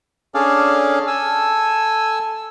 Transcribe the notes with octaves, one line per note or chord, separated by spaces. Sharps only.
C#4 D4 G#4 A4 D5 F5
A4 G#5 E6